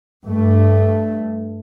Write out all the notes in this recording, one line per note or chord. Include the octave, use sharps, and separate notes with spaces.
G2 A3